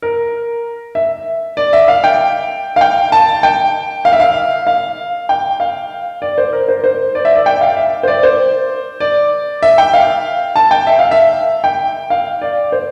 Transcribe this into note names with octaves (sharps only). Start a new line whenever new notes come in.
A#4
E5
D5
E5
F5
G5
F5
G5
A5
G5
F5
E5
F5
F5
G5
F5
D5
C5
A#4
C5
C5
D5
E5
D5
G5
F5
E5
C5
D5
C5
D5
E5
G5
F5
A5
G5
E5
F5
E5
G5
F5
D5
C5